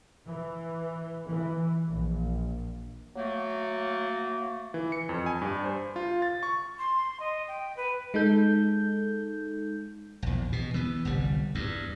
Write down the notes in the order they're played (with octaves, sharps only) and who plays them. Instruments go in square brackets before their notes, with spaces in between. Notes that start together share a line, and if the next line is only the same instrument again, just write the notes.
[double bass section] E3
E3
A#1
[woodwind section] F#3 A3 A#3
[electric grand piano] E3
C#7
F2
G#5
G2
C5
F4
A6
C#6
[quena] C6
D#5
G5
B4
[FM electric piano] G#3 D#4 A4 G6
[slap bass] A#1 E2
B2
E3 B3
G1 C2 G3
E2 G2